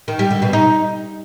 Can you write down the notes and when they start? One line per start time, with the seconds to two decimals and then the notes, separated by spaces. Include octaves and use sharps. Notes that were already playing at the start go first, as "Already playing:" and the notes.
0.08 D#3
0.19 G3
0.31 D3
0.42 B2
0.53 D#4